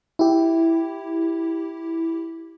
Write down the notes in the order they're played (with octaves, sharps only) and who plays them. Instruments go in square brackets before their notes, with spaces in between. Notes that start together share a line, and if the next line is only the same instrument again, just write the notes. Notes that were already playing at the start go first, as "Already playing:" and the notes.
[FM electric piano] E4 G4